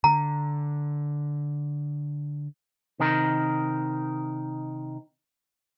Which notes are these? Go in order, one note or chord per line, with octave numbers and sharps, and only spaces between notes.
D3 A#5
C3 D#3 D#4 A#4